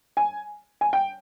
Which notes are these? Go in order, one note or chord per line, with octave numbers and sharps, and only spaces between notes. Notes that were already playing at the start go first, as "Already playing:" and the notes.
G#5
G#5
G5